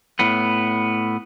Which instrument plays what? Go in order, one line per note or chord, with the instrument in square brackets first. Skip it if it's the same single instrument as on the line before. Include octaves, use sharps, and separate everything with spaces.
[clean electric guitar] A2 B3